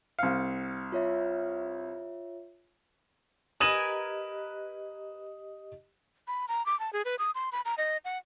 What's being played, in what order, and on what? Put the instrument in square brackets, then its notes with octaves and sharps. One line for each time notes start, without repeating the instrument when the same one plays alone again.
[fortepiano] C2 F5 [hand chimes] C#7
[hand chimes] F4 C#5 E5
[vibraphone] G4 D#5 [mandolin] A#4 B4 G#5 [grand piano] D#6 E7 F#7
[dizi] B5
A#5
D6
A5
G#4
B4
D#6
C6
B5
A#5
D#5
F#5